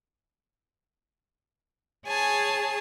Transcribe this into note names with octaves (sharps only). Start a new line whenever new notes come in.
G#4 C#5 G#5 A5